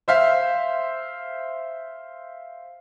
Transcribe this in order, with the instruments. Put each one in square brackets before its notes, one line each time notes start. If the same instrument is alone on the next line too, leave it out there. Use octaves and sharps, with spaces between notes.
[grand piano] C5 E5 F5